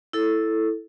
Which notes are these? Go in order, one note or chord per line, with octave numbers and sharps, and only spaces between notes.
E4 A4